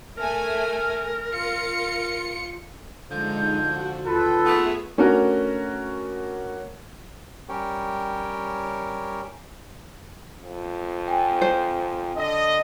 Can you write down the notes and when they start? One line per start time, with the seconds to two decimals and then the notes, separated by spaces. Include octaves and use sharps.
0.18 A3 A#4 G#5
1.31 F4 C#7
3.11 D3 F3 G#3 D#4 G6
3.63 F#4
4.06 D#2 F4 A4 B4 G5
4.46 A3 B3 G#4 E5
4.98 A3 C#4 D4 F#4 A#4
7.49 G3 C#4 G4 A#4 C#5 G5
10.41 F2
11.08 G5 G#5
11.42 C5
12.17 D3 D#5